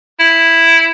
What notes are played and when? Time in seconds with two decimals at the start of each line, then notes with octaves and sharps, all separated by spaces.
0.20 E4